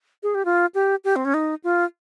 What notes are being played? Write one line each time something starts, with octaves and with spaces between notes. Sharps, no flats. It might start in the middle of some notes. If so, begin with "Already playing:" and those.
G#4
G4
F4
G4
G4
C4
C#4
D#4
F4